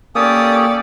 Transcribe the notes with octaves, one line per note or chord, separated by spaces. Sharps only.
A#3 C#4 G4 A4 D5 D#6